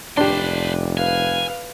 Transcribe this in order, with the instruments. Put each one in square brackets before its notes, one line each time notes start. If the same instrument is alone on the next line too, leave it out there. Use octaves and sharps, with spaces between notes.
[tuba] F1 [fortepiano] D4 G4 [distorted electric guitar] B4 C6
[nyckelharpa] B4 F5 [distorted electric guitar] G#5